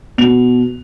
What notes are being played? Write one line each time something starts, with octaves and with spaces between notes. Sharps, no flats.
B2 F7